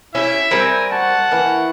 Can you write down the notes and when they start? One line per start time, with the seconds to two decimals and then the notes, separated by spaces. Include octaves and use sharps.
0.15 C#4 E4 G4 E5
0.51 G3 C4 A#4 G#5
0.92 F#5 A5 C#6
1.32 E3 A#3 E4